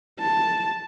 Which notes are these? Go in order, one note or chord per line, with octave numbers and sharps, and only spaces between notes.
A5